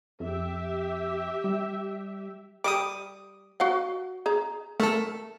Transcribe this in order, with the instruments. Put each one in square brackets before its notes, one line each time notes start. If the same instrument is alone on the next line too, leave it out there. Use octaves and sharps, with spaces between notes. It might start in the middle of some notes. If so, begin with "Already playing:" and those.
[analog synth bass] F2 [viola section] G4 E5
[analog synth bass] G3
[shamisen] G3 B5 [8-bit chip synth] D6 D#6
[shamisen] F#4 F5 F#5
G#4 A#5
[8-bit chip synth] A3 A4 [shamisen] A#4